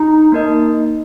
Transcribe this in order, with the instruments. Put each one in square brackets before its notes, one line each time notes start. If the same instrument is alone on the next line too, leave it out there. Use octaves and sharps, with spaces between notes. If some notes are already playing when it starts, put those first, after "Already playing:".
Already playing: [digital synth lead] D#4
[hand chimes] A#3 D#4 A#4 D#5